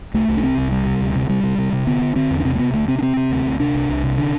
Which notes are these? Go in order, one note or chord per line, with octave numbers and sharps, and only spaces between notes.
C2 A3
C2
D4
C3 C4
C2
C3 G3
C3
D2
C3
C3 G3
C3
C3
C3
D3 B3
D3
D3 C4
E2
D4
C3 C4
A3
C3 B3
D2 A3
C3 C4
D4
C3 C4
C3
D2
D2
C3 D4
C2
C2
C3
D3 D4